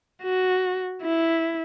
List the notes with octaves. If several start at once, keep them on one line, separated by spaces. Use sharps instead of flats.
F#4
E4